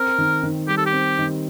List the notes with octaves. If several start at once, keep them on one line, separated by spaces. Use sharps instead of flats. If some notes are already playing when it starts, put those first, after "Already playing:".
Already playing: C4 A#4
D#3
D#3
G3 G4
A4
G4
C4
D#3